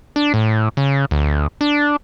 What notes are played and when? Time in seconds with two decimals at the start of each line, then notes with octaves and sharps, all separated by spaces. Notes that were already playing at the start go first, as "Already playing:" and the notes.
0.16 D4
0.34 A2
0.77 C#3
1.11 D2
1.61 D4